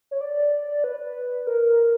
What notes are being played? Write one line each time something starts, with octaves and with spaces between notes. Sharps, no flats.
C#5
D5
B4
A#4